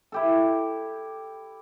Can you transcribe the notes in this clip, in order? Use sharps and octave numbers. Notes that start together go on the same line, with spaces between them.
E4 G4 A4